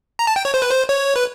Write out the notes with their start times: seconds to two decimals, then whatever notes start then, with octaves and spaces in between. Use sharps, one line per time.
0.19 A#5
0.27 A5
0.36 G5
0.45 C#5
0.54 C5
0.62 B4
0.70 C5
0.89 C#5
1.16 B4